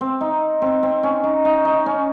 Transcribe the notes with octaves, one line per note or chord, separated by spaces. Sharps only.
C4
D#4
C4
C4
C#4
D#4
D#4
D#4
C#4